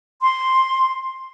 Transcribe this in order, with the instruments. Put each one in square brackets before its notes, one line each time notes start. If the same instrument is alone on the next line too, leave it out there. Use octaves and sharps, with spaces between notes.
[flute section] C6